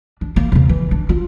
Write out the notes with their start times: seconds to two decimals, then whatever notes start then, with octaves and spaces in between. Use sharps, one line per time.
0.21 D4
0.36 A#3
0.52 E2 C#3
0.69 E3
0.91 D4
1.09 F4